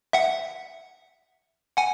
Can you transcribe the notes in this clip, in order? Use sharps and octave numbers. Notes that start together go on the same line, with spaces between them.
E5 F#5
F#5 G#5